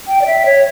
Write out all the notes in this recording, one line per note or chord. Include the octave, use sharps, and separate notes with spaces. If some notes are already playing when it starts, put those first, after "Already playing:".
G5
D5
E5
C#5